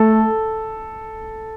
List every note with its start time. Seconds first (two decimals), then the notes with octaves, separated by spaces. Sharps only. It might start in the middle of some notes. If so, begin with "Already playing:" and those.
Already playing: A3 A4